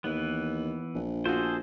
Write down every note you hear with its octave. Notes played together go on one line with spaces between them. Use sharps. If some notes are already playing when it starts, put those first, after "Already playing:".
D#2 E3 B3
A#1
F4 F#4 G#4 A4 C5